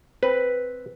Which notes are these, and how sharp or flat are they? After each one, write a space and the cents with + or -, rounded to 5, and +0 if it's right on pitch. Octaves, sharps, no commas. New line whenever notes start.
C4 +0 B4 +0